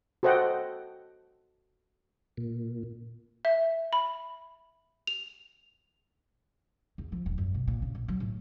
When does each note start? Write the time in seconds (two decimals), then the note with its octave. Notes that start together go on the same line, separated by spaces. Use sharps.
0.23 F#4 A4 C5 D#5 F#5 G5
2.37 A#2
3.45 E5
3.93 B5
5.07 F7
6.98 E2
7.12 F3
7.26 D#1
7.38 F#2
7.54 B2
7.68 A#2
7.82 C#3
7.95 A#1
8.08 F#3
8.20 A2